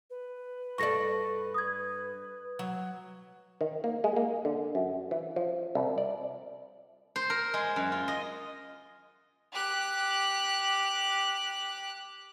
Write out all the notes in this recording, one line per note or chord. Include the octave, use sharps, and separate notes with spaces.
B4
G2 A4 D5 C#6 A#6
D#6 G#6
F#3
D#3
A#3
G#3
A#3
D3
F#2
E3
F3
C2
D5
C5
A#4
G#3
F#2
F4
D#5
G4 F#6